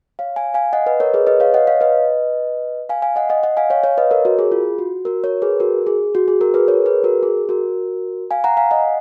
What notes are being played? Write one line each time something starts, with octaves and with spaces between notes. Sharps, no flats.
C#5 F5
F5 G#5
F5 G#5
D#5 F#5
B4 D#5
A#4 C#5
G#4 B4
B4 D#5
C#5 F5
D#5 F#5
C#5 F5
B4 D#5
F5 G#5
F5 G#5
D#5 F#5
D#5 F#5
D#5 F#5
F5 G#5
C#5 F5
C#5 F5
B4 D#5
A#4 C#5
F#4 A#4
G#4
F4
F#4
F#4 A#4
A#4 C#5
G#4 B4
F#4 A#4
G#4
F#4
G#4
F#4 A#4
G#4 B4
A#4 C#5
G#4 B4
F#4 A#4
G#4
F#4 A#4
F5 G#5
F#5 A#5
F5 G#5
D#5 F#5